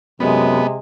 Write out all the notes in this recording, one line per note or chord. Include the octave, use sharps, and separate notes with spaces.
F#2 C3 G#3 B3